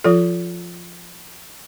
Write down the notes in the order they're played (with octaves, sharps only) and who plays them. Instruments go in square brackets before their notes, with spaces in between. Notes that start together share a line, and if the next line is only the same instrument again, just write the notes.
[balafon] F3 F4 A4